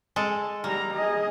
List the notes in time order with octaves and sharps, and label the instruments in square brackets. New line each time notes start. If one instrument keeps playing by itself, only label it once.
[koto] G#3 A4
[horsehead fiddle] G3 A#5 [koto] A#3
[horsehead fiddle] G#4 D#5